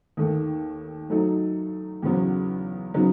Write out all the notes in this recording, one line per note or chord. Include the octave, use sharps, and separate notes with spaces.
D#2 D#3 A3
F#3 A3 D#4
E2 C#3 F#3 B3
C#3 F#3 B3 D#4